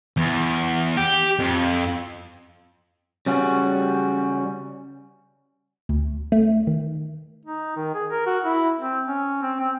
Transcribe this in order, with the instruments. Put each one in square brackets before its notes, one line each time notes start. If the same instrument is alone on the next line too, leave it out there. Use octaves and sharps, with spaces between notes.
[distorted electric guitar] E2
G4
F2
[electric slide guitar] C#3 G3 C#4 F#4
[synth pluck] D2
A3
D#3
[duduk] D#4
D#3
G#4
A#4
F#4
E4
C4
C#4
C4
C4